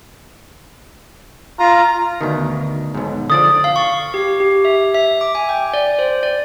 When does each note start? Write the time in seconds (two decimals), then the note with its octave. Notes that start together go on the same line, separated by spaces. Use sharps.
1.59 F4 A#5
2.21 D2 B2 D#3
2.95 B1 G#2
3.30 D3 F3 D5 D#6 A6
3.64 F5
3.76 C#6
4.14 G4
4.40 G4
4.65 E5
4.94 E5
5.21 D6
5.35 G#5
5.49 G5
5.74 D5
5.99 C5
6.23 D5